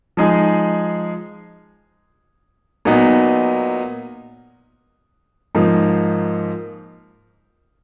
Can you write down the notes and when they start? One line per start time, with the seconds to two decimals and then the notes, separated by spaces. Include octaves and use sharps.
0.17 F3 G#3 D#4 G#4
2.85 A#2 F#3 B3 D#4
5.55 G#2 F3 A#3 D#4